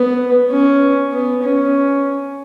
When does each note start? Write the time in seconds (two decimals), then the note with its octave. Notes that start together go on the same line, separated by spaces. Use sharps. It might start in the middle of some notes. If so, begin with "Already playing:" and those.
Already playing: B3
0.50 C#4
1.12 B3
1.43 C#4